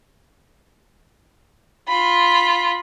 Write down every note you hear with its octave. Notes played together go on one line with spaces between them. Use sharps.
F4 B5